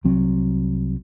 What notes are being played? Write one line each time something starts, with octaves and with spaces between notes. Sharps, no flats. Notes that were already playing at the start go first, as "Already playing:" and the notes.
C2 F#3 C4